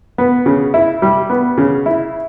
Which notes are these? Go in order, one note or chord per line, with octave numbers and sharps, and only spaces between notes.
B3
C#3
E4
G3
B3
C#3
E4